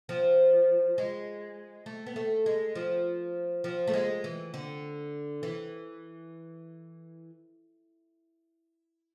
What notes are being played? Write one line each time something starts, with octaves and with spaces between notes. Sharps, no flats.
F3
G#3
A3
B3
A3
G#3
F3
F3
A3
G#3
E3
D3
E3